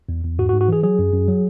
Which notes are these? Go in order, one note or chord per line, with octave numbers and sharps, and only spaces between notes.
E2
E2
G#2 F#4
F#4
G#2
F#4
E3 G#4
F#3 G#4
F#2
F#2
F#3